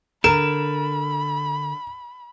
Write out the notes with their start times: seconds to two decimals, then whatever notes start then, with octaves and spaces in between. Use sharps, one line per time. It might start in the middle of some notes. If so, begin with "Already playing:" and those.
0.24 D3 A#4 B5 E7